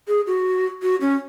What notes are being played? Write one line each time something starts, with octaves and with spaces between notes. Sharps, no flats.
G#4
F#4
F#4
C#4